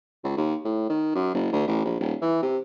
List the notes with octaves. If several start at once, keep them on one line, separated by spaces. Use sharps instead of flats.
C#2
D#2
A2
D#3
F#2
F#1
D2
A1
A#1
D#1
E3
C3